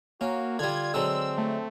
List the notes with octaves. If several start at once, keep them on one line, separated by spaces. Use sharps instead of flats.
A#3 C#4 F#4
D3 G3 F4 G#6
D3 F#3 G#3 C4 E6
A3